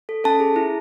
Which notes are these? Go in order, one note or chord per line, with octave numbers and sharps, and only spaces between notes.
A4
C#4 A4 A5
G#4
E4